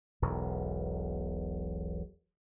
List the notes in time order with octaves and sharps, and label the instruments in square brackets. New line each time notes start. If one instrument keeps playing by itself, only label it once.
[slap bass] E1 B1 E2